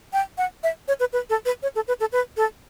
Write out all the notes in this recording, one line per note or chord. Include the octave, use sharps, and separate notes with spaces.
G5
F#5
E5
C#5
B4
B4
A4
B4
C#5
A4
B4
A4
B4
A4